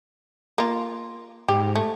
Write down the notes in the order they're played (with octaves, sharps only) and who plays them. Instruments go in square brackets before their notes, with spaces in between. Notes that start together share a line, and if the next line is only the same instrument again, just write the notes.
[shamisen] A#3 F4
[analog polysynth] G#2 [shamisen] G4
[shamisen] A3